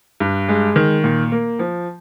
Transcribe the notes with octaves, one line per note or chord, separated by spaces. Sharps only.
G2
G#3
D#3
A#2
A#3
F3